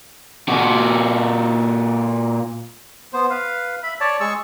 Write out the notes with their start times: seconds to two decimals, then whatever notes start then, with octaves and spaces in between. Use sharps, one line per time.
0.49 A#2 F#4
3.13 B3 C5
3.30 B4 F5
3.83 E5 B5
4.00 C#5 D5 A5
4.20 G#3 G#4 C#6 E6